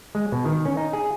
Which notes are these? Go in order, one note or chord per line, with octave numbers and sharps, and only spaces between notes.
G#3
B2
D#3
C#4
D#4
G#4